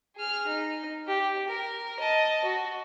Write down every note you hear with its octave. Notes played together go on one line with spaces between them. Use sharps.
G#4 F6
D#4
G4
A#4
D#5 A5
F#4